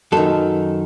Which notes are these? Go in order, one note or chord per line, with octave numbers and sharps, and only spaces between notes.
F#2 D#3 A4